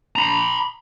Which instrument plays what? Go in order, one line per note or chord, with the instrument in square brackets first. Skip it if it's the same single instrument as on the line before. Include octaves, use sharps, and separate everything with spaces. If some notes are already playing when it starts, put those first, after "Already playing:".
[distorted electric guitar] A#5 B5